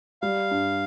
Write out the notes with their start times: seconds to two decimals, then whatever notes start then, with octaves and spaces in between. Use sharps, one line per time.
0.22 G3 F5
0.51 G2